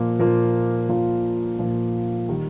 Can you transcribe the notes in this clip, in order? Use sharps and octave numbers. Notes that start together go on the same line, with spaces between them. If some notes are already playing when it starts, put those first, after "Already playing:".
Already playing: A#2 F3 A#3 F4
A#2 F3 A#3 F4
A#2 F3 A#3 F4
A#2 F3 A#3 F4
D#3 G3